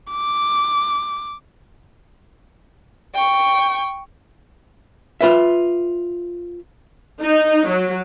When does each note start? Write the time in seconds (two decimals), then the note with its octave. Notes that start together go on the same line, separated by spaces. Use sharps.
0.12 D6
3.15 G5 C#6
5.21 F4 B4 E5
7.20 D#4
7.69 F#3